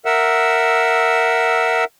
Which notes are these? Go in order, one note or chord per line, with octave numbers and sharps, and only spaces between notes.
A#4 E5 F#5 E6